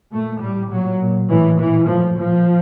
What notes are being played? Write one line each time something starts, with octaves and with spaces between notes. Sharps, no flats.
A#2 A3
A2 G3
A#2 F#3
A#2
A2 E3
A#2 E3
A2 F3
A#2 F3